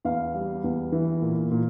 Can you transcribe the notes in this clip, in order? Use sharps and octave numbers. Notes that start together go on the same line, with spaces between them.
E2 F5
G3
E2
E3
A#2
A#2